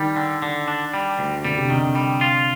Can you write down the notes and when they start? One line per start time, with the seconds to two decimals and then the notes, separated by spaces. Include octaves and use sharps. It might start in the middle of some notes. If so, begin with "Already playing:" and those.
Already playing: D#3 G3
0.16 D3
0.42 D3
0.68 D4
0.94 G3
1.19 D2
1.45 D3 G3
1.58 C3
1.70 D3 D#3
1.95 G3
2.21 F4